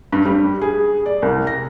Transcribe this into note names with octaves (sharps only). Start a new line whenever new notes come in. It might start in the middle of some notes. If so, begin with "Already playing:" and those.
G2
G3
G#4
D5
C2
A#6